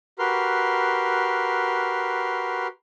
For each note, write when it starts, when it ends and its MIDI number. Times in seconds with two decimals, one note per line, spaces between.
0.19 2.67 66
0.19 2.67 67
0.19 2.67 70
0.19 2.67 71
0.19 2.67 84
0.19 2.67 89